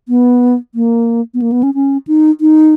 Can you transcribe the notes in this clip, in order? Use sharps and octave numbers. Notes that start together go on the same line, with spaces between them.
B3
A#3
B3
A#3
B3
C#4
C#4
D#4
D#4